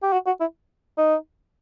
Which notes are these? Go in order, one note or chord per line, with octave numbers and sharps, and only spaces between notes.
G4
F#4
F#4
E4
D#4